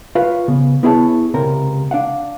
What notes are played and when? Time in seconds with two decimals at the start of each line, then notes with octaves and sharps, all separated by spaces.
0.15 F4 B4 C#5 F5
0.48 C#3 B3
0.83 B3 E4 G#4 C#5 D#5 A5
1.34 C#2 C3 A#4
1.91 D4 F5 F#5